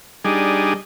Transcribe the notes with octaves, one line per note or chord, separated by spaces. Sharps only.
G3 D4 D#4 G#4